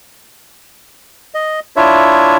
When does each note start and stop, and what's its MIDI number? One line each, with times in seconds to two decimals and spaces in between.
1.35 1.60 75
1.76 2.37 62
1.76 2.37 64
1.76 2.37 65
1.76 2.37 73
1.76 2.37 76